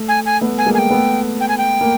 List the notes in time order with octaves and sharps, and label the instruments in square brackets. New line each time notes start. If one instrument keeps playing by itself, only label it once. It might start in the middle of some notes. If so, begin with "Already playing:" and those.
Already playing: [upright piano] A3
[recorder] G#5
G#5
[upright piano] A3 B3
[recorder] G#5
[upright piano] G#3 A#3
[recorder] G#5
G5
[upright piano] A3 B3
[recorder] G5
G#5
G5
[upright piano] A#3